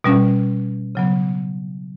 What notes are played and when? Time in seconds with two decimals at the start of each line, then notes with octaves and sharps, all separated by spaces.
0.04 B2 G3 C#4
0.95 C#3 F#3 B3